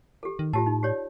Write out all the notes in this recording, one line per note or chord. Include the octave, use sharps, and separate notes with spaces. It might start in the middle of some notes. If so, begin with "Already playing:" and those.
G4 A4
D#3
A2 F4 G4 A5
D#4
G4 C#5 D5